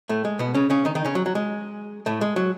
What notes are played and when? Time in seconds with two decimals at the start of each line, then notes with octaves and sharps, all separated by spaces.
0.09 A2 A3
0.25 G#3
0.39 B2 B3
0.55 C#3 C#4
0.70 C#3 C#4
0.85 D#3 D#4
0.95 D#3 D#4
1.05 C#3 C#4
1.15 F#3
1.26 F#3
1.35 G#3
2.06 A2 A3
2.21 G#3
2.36 F#3